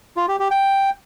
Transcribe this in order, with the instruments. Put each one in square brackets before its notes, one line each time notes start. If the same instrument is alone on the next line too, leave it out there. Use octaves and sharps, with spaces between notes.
[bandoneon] F4
G4
G4
G5